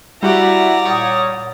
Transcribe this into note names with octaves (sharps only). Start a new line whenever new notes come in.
G3 E4 F#4 G4 D5 E5 F#5 A#5
A#2 G3 C#5 D#6